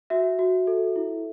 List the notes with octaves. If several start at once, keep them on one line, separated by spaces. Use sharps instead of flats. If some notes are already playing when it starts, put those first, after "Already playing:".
F#4 E5
F#4
A4
E4